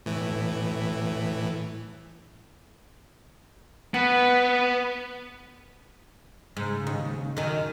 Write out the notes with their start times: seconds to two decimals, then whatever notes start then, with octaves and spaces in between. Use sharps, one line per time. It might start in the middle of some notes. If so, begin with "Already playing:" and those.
0.06 A2 E3
3.94 B3 F#4 B4
6.57 G#2 C#3
6.87 D#2
7.37 F#2 D#3